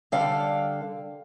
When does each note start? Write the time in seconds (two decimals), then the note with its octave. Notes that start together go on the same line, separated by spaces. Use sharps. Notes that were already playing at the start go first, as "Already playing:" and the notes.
0.12 D3 G3 A4 F5 G5